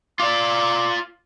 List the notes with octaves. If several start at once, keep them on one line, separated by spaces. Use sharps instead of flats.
F4 D5 D6